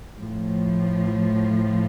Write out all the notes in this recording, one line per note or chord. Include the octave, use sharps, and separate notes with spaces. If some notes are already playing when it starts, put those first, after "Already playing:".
A2 F3